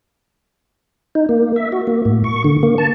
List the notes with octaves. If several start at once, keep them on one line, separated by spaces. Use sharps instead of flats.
D#4
A#3
E5
F#4
A#3
A2
C#6
D3
A#3
A5